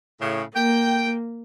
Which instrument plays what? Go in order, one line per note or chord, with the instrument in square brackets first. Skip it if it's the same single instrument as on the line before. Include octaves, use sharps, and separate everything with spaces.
[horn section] A2 C#3
[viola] A#3 [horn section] G5